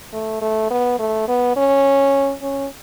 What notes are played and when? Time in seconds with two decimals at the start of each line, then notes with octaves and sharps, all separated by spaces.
0.13 A3
0.42 A3
0.71 B3
0.99 A3
1.28 B3
1.56 C#4
2.42 C#4